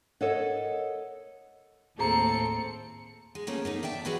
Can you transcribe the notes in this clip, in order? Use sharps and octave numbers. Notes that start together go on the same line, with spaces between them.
A4 A#4 C#5 D#5 E5 F#5
D#2 A2 C4 G#4 A4 A#5 C#7
G#3
F3 A3 A#3 C#4
A#3 B3 D#4
D5 E5 G5 A5
E3 F3 F#4 G#4 B4 F#5